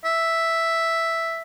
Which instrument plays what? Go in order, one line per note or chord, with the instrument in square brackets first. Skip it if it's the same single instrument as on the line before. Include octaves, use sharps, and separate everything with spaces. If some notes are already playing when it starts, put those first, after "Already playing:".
[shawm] E5